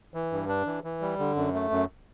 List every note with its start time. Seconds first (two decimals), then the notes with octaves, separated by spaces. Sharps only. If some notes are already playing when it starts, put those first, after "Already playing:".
0.14 E3
0.32 G2
0.48 D4
0.66 E3
0.84 E3
1.01 G3
1.19 D3
1.36 F#2
1.54 A3
1.71 F#2